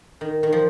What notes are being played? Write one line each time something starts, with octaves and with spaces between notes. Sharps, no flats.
D#3
D#3
F3